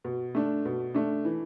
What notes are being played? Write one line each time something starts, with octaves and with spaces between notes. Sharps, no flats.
B2
A3 D4
B2
A3 D4
E3